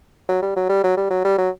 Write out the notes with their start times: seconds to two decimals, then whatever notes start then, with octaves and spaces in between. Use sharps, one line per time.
0.29 F#3
0.42 G3
0.56 F#3
0.69 G3
0.83 F#3
0.97 G3
1.10 F#3
1.24 G3
1.38 F#3